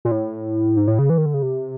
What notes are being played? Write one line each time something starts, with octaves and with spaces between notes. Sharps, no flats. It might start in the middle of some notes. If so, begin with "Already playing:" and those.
A#2
A2
G#2
A2
C#3
E3
D#3
D3
C#3
C3